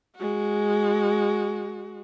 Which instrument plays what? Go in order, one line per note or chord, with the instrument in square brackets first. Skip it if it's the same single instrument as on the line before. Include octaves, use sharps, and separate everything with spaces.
[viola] G#3 F#4